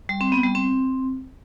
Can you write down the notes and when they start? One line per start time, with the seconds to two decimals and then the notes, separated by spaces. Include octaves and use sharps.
0.09 G3
0.21 C4
0.32 B3
0.43 G3
0.55 C4